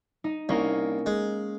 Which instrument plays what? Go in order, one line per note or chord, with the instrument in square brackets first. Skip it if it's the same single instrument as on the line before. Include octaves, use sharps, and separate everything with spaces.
[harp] D#4
[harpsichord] C2 [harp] A#3 C#4 A#4
[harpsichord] G#3